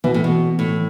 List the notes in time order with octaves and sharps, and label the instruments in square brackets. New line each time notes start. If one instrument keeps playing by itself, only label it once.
[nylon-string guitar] B2 [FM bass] E3
[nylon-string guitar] A2
B2
A2